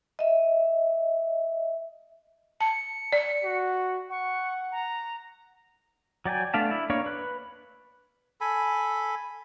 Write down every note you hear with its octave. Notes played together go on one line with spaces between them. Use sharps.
D#5 E5
A5 C#7
D5
F#4
F#5 C#6
A#5
F#3 D5 G5 G#5
A3 B3 D4 F5 A5
E4
A#3 D4 C#5 F5
B4 F#6
A4 G#5 B5